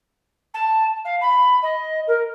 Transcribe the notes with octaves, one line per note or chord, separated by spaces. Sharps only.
A5
F5
B5
D#5
A#4